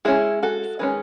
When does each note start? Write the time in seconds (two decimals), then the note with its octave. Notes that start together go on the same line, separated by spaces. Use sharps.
0.05 G#3 C#4 E4 G#4
0.43 F#4 A4
0.79 D#3 G#3 C#4 G#4 B4